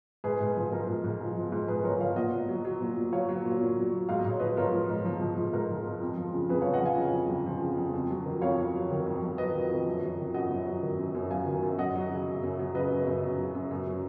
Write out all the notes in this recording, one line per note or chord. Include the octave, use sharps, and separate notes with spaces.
G#2 G#4 B4
G#2
F3
F3 A#4
G#2
G#2
F3
F3
G#2
G#2 G#4 B4
F3 A#4 C#5
F3 C#5 F5
A#2 D#5 F#5
A#2
F#3
F#3
A#2
A#2
F#3 C#5 F5
F#3
A#2
A#2
F#3
F#3
G#2 F5
D#5
G#2 C#5
F3 B4 D#5
F3 A#4 C#5
G#2
G#2
F3
F3
G#2
G#2 A#4
F3
F3
F2
F3
C#3
F2 G#4 B4
F2 C#5 F5
D#5 F#5
F3 F5 G#5
C#3
F2
F2
F3
C#3
F2
F2
F#3
D#3
F2 C#5 F5
F2
F#3
D#3
F2
F2
F#3 B4 D#5
D#3
F2
F#2
F#3
D#3
F#2 D#5 F#5
F#2
F#3
D#3
F#2
F#2
F#3 F5 G#5
D#3
F#2
F#2 D#5 F#5
F#3
C#3
F#2
F#2
F#3
C#3 B4 D#5
F#2
F#2
F#3
C#3
F#2
F#2
F#3